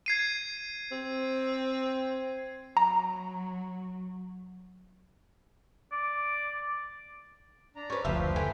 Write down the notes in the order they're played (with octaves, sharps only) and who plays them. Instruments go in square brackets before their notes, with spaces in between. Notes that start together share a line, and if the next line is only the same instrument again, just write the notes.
[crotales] G#6 C7 D#7
[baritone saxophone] C4
[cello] F#3 [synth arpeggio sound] A#5
[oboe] D5
[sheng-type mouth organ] D4 A#5
[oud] C#4 B4
[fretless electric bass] F#1 D2 [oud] F3 E5 [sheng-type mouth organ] G4 B4 C5
[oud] D3 E3